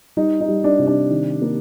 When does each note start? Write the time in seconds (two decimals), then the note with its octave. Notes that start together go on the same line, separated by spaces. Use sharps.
0.17 G3 D#4
0.40 D#4
0.48 G3
0.64 D4
0.79 C3
0.87 D4
1.10 D#3
1.42 A#3